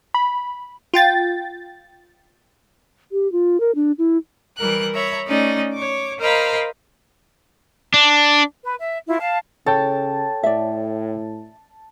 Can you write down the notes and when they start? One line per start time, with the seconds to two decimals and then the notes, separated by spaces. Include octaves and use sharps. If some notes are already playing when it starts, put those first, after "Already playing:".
0.14 B5
0.94 F4 G5 A6
3.12 G4
3.32 F4
3.60 A#4
3.75 D4
3.98 E4
4.57 E3 G3 A#4 F#6
4.94 C#5 E5 A#5 B5
5.27 A3 C#4 D#4 D5 D#5
5.73 C#5 D6
6.19 A#4 C5 D#5 F5 A#5 B5
7.94 D4
8.64 B4
8.79 E5
9.07 E4 F4
9.19 F5 A5
9.66 C#3 A4 C#5 G5 A5
10.43 A2 D5 E5